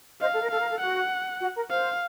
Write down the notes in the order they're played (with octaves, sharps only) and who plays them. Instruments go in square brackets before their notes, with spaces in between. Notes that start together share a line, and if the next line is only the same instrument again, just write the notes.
[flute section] C5 D#5 [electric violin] F5
[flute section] A4
A#4
[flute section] A4 [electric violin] F5
[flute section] A#4
A4
[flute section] F#4 [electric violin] F#5
[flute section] F#4
A#4
[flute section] C5 [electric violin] F5